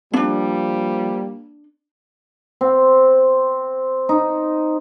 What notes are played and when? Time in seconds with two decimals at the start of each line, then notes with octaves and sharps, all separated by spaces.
0.13 F3 G3 A#3 C#4 D4
2.61 C4
4.09 D#4